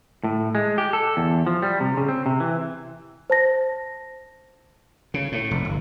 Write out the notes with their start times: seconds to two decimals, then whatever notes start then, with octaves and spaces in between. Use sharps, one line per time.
0.24 A2
0.55 G#3
0.78 G4
0.93 A4
1.17 E2
1.47 F3
1.62 G3
1.80 C3
1.97 C#3
2.08 C4
2.26 C3
2.40 E3
3.30 C5 A5 A#6
5.14 C#3
5.32 A2
5.51 F1
5.65 G1